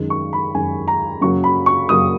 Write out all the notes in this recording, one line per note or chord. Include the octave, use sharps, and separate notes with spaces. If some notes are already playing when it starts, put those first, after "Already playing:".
Already playing: F#2 D#3 G#3
C#6
B5
F#2 D#3 G#3 G#5
A#5
F#2 C#3 F#3 A#3 C#6
B5
C#6
F#2 C#3 F#3 A#3 D#6